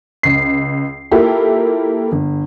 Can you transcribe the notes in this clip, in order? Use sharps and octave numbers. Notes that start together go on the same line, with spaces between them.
C#2 C7
A#3 E4 F4 G4 A4
G1